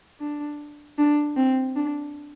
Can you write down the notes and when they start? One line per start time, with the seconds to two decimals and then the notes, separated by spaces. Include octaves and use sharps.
0.20 D4
0.99 D4
1.37 C4
1.76 D4